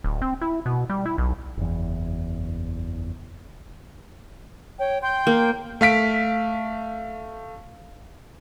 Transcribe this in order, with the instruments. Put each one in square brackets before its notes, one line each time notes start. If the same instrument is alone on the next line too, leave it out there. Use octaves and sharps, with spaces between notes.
[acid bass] D1
C4
E4
B2
G3
E4
B1
[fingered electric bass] F#1 E2
[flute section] C#5 G5
G5 C6 G6
[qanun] A#3
[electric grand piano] A3 F5 B6 D7